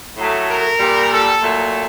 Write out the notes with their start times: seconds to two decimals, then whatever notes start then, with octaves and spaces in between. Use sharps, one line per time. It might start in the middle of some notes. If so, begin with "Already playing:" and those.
0.17 A2 F#3 A3
0.49 A#4
0.79 A#2 G3
1.11 A4
1.42 A#2 F#3 A3